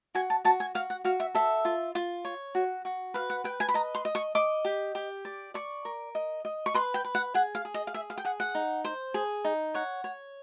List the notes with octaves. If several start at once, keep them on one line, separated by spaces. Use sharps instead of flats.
F#4 G#5
A5
F#4 A5
G#5
F#4 F5
F#5
F#4 F5
E5
A4 E5
F4
F4
C#5
F#4
F#4
B4 F5
F#5
B4 G5
G#5
B5
D#5 A#5
C6
D#5
C#6
D#5 D6
G4
G4
D5
D5 C#6
A#4
D#5
D#5
C#6
B4 C6
G5
B4
F#5
G#4 F#5
F5
G#4
D#5
F5
G#4 E5
F5
G5
G#4 F#5
F#5
D#4
C5
G#4
D#4
C#5 F#5
C#5